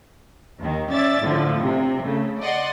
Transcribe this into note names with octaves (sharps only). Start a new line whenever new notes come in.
D#2 D#3
C#4 D5 E5 A6
A2 D3 F3
C3
C#3 A3
D5 D#5 F#5 C6